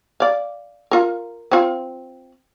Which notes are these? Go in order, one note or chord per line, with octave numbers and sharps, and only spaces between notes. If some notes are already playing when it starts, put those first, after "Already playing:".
D5 F5
F4 A#4
C4 F4